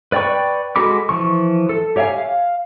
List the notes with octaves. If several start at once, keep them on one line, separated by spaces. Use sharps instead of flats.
B4 D5 G5 B5 C#6
G#3 F#4 A4 B5 D6
E3 F3 C#6
A4
G4 C#5 E5 F5 G#5
F5